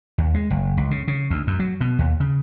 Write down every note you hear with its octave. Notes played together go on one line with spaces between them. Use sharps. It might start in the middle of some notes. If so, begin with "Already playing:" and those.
D#2
G#3
F#1
C#2
C#3
C#3
D2
F#2
F#3
B2
D#2
C#3